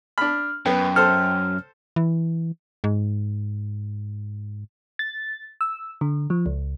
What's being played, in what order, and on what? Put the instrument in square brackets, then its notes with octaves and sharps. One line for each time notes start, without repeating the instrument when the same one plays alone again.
[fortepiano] D4 B5 [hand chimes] F6
[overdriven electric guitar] F#2 [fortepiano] B3 [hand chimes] G5
[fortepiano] A4 C5 [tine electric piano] F6
[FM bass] E3
G#2
[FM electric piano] A6
E6
D3
F3
C#2